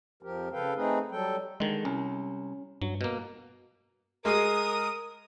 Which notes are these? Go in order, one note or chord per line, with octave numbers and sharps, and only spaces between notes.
F2 F3 G4 A#4
C#3 A4 B4 F5 G5
A3 C4 D#4 G#4 B4
F#3 G3 A4 G5
D3 D#3 G#3
C2 C#4
G2 F#3
B2 A#3
G#3 G#4 A#4 D#6